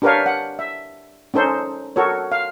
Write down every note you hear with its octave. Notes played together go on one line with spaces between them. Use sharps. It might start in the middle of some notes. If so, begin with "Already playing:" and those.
D4 G4 A#4 B4 C#5 F5
F#5
E5
C#4 D#4 A4 C5
F#4 A4 A#4 C#5
F5